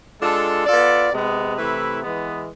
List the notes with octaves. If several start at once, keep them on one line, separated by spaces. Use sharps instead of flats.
G#3 D4 F4 A4
B3 F4 A4 D5
C3 G#3 B3
C3 E3 A3 E4 B4
E3 G#3 B3